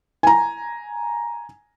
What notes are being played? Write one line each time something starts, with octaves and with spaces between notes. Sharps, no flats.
G#5 A#5